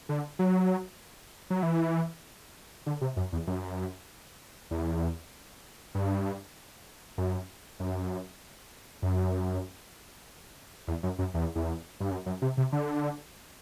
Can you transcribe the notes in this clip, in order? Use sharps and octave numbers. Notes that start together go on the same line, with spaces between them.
D3
F#3
F#3
E3
D3
C3
F#2
E2
F#2
E2
G2
F#2
F#2
F#2
E2
F#2
F#2
E2
E2
G2
F#2
F#2
C3
C3
D3